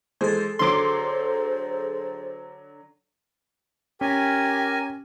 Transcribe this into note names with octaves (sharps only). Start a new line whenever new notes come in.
E3 G#3 G#4 A4 C5
D3 F#3 C5 C6 D6
C#4 G4 A#4 G#5